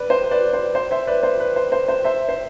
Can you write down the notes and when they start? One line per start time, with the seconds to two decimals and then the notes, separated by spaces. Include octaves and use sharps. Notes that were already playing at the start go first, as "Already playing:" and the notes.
Already playing: B4 D5
0.10 C5
0.31 B4 D5
0.53 C5
0.75 C5
0.91 C5 E5
1.07 B4 D5
1.23 C5
1.40 B4
1.56 C5
1.72 C5
1.88 C5
2.04 C5 E5
2.29 C5